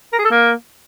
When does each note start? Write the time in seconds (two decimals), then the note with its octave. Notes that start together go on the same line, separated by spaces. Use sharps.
0.13 A#4
0.19 G#4
0.25 A4
0.31 A#3